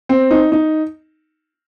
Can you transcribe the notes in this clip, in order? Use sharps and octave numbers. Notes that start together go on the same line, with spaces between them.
C4
D#4
D#4